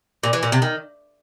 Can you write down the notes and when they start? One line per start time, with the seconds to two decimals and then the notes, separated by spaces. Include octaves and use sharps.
0.23 A#2
0.33 E3
0.43 A#2
0.52 C3
0.62 D#3